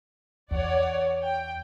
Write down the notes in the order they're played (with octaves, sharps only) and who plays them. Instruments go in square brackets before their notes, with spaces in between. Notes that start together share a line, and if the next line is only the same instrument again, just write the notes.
[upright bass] E2 [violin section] C#5 D5 F#5
[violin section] G5